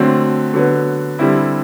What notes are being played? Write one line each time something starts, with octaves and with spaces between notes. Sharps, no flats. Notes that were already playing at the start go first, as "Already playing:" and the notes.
Already playing: D3 F#3 A3 C4
D3 F#3 B3
D3 G3 C4 E4